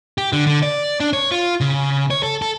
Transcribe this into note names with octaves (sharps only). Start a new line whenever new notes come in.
G4
D3
D3
D5
D4
C#5
F4
C#3
C#5
A4
A4